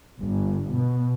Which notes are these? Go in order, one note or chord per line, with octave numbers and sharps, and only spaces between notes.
G1
B2